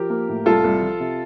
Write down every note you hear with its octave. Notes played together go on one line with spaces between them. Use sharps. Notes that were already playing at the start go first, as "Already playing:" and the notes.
Already playing: F3 G4 A#4
A#3
A2
C2 F4 A4
C2
F3
C3